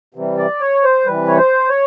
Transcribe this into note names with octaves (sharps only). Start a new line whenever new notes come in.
C3 E3 G3
D5
C#5
C5
C3 E3 G3 B4
C#5
C5
C#5